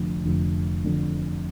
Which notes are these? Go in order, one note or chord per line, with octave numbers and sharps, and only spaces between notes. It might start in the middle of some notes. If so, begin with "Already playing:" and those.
Already playing: F1 F2 D3
F1 F2 D3
F1 F2 D3